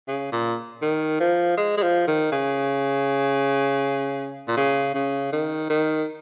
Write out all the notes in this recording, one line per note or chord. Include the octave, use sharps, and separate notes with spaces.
C#3
A#2
D#3
F3
G#3
G#3
F3
D#3
C#3
A#2
C#3
C#3
D#3
D#3